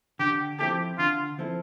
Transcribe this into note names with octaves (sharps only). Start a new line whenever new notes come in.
D3 G4
F3 C4 E4 G4 A4
D3 F4
F3 C4 E4 A4